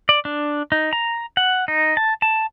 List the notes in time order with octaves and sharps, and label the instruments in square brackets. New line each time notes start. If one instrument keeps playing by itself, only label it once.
[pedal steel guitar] D5
D4
D#4
A#5
F#5
D#4
A5
A5